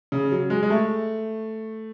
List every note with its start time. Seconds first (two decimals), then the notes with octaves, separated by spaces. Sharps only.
0.12 C#3
0.32 F#3
0.50 G#3
0.63 G#3
0.70 A3